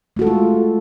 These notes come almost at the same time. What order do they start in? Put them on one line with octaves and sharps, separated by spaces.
A3 F#4 A4 G#3 F4